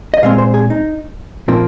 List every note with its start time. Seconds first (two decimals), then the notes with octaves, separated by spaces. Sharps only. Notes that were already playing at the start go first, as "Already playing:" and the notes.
0.14 D#5
0.23 A#2 G#3 C4 F5
0.38 C5
0.54 G#4
0.70 D#4
1.48 A#2 F3 A#3 C4